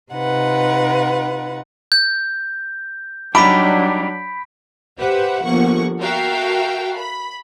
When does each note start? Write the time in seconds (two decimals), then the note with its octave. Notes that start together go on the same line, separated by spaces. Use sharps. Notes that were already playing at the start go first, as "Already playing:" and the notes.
0.13 C3 D#4 F4 B4 F#5
1.92 G6
3.35 F#3 G3 D4 D#4 D5 B5 B6 D7
4.97 G4 B4 C5 E5 F#5
5.44 G1 F3 A#3 F#5 C#6
6.01 F#4 A4 A#4 E5 F5 G5
6.96 B5